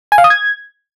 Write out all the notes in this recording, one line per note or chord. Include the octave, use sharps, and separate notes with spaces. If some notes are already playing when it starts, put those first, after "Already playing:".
G#5
F5
D#6
G#6